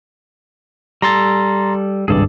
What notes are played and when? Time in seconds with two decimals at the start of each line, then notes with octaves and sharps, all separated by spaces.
1.02 G3 A4 A#5 C6 A6
2.08 G#1 C#2 G2 G#4 A4 D5